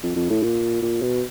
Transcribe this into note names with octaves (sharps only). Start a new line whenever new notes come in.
F2
F2
A2
A#2
A#2
B2